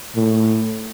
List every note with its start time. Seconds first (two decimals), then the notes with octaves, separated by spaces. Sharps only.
0.16 A2